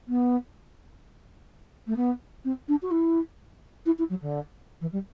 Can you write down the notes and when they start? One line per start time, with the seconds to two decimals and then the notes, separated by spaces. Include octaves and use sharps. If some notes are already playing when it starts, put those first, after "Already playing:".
0.08 B3
1.86 A3
1.96 B3
2.44 C4
2.68 D4
2.82 F#4
2.91 E4
3.85 E4
3.98 E4
4.09 F#3
4.21 D3
4.81 E3
4.92 G3